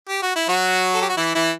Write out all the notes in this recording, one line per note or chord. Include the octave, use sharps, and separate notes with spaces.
G4
F#4
E4
F#3 F#4
A4
G4
F#4
E3 E4
E3 E4